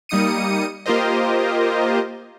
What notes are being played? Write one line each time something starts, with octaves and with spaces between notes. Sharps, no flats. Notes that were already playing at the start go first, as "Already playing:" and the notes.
G3 A#3 D#4 D#6 C#7 D#7
A#3 F4 G4 A#4 C5 D#5